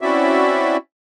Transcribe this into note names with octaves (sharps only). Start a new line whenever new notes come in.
C4 C#4 E4 F#4 D5 E5